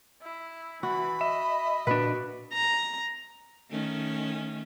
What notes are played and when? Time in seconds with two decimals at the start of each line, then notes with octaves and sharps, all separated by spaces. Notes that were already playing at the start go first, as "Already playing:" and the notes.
0.22 E4
0.83 E3 F#4 B5
1.21 D#5 E5
1.87 A#2 D4 F#4 B4
2.53 A#5
3.71 D#3 A3 C#4